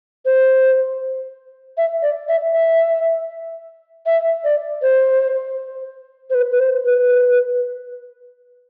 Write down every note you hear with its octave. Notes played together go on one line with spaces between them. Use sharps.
C5
E5
D5
E5
E5
E5
D5
C5
C5
B4
B4
C5
B4